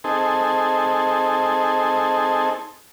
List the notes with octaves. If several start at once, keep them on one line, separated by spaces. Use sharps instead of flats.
C4 D#4 G#4 A4